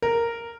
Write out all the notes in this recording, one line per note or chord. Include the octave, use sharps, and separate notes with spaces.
A#4